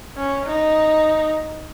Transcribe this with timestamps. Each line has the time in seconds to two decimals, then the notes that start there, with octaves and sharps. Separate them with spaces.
0.17 C#4
0.45 D#4